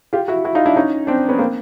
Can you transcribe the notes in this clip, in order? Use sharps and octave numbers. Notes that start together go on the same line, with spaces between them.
F4 G4
E4 F#4
E4 F#4
D#4 F4
D4 E4
C#4 D#4
C4 D4
B3 C#4
A#3 C4